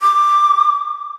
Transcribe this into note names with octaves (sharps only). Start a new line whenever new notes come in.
D6